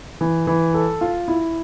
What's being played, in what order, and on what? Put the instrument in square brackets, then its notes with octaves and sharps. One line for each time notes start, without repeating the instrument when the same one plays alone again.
[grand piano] E3
E3
A4
F4
E4